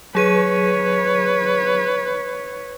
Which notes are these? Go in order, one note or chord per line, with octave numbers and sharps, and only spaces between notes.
F#3 G#4 B4 C#5 D#7